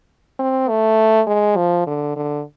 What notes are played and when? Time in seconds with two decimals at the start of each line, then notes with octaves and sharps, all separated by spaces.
0.39 C4
0.69 A3
1.27 G#3
1.56 F3
1.87 D3
2.16 D3